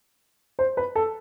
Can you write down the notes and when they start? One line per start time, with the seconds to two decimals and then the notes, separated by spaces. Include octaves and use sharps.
0.59 C5
0.77 B4
0.95 A4